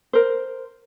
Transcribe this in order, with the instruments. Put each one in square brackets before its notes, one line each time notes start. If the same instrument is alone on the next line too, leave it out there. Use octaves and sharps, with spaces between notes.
[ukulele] A#4 C5